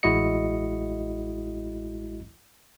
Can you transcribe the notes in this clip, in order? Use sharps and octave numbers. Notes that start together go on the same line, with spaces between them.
A1 G#3 E4 F#4 D#5 C#7